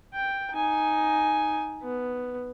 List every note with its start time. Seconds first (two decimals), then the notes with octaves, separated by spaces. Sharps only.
0.14 G5
0.53 D#4 G#5
1.83 B3